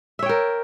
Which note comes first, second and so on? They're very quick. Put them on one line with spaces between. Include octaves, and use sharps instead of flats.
E5 C#5 G5 A#4